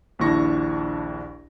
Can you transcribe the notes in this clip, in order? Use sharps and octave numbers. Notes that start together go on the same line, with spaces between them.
A#1 D#2 D4 E4 C#6 A#6